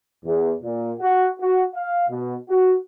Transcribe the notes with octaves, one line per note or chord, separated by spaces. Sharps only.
E2
A#2
F#4
F#4
F5
B2
F#4